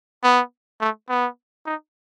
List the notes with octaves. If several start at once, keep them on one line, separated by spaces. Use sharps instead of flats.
B3
A3
B3
D#4